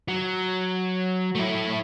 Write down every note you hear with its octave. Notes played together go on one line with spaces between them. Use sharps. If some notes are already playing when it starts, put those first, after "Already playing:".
F#3
A3 E4